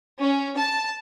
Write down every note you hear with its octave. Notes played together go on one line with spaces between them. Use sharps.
C#4
A5